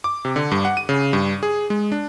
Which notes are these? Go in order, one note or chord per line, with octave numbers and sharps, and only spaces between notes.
D6
C3
D3
G2
F#5
D#7
C#3
G2
G#4
G#3
D4